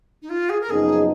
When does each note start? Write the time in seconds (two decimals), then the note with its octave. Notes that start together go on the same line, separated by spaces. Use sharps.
0.22 D#4
0.29 F4
0.50 G#4
0.61 A#4
0.69 F#1 F#2 F3 B3 D#4 G#4